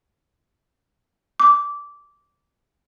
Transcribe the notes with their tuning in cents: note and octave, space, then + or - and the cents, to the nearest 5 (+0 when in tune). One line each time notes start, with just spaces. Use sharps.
D6 -15